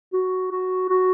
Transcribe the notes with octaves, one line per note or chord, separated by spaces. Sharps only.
F#4
F#4
F#4